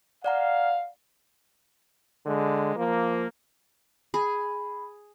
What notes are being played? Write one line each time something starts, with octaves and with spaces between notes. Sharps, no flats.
D5 F5 F#5 A#5
D3 G#3
F3 A#3
G#4 B5